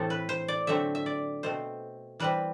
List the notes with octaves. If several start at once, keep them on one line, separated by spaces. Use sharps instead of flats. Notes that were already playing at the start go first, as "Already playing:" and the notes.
Already playing: A2 E3 A3 C4 A4
B4
C5
D5
D3 F#3 A3 C4 E5
E5
D5
B2 A3 C4 C5
E3 G3 C4 B4